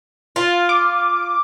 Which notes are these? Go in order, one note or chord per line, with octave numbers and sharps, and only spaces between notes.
F4
D6